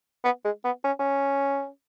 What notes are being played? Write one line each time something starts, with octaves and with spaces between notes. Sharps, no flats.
B3
G#3
B3
C#4
C#4